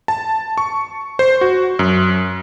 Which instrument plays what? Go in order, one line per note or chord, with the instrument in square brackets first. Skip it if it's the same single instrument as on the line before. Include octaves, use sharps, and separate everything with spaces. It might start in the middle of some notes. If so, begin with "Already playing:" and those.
[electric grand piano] A5
C#6
C5
F#4
F#2